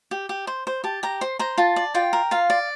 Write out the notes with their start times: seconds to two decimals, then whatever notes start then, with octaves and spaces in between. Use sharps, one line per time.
0.11 G4
0.29 G4
0.47 C5
0.67 C5
0.84 G4 A5
1.03 G4 A#5
1.21 C5 C6
1.39 C5 A#5
1.58 F4 A5
1.76 D5
1.95 F4 G5
2.13 A#4
2.31 F4 F5
2.50 D5